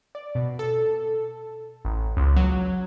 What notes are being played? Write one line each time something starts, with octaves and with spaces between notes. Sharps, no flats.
D5
B2
A4
A1
C#2
F#3